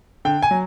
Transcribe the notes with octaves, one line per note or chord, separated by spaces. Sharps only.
D3 G5
G#5
F#3